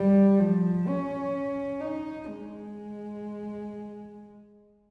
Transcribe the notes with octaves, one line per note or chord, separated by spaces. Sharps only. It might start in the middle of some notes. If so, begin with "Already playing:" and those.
Already playing: G3
F3
C#4
D#4
G#3